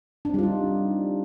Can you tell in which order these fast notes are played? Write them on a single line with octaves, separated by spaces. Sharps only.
D4 C4 G3 F4 D#4